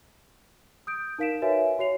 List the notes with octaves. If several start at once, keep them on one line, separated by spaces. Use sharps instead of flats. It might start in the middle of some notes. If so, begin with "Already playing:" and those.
D#6 G6 D7
D#4 A#4 F5 B6 D7 E7
F#4 A#4 B4 C#5 E5 G#5
F#4 C#5 C7 F7